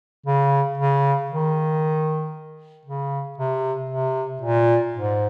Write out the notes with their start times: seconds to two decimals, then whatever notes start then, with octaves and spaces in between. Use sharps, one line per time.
0.26 C#3
0.78 C#3
1.30 D#3
2.86 C#3
3.38 C3
3.89 C3
4.42 A#2
4.94 G#2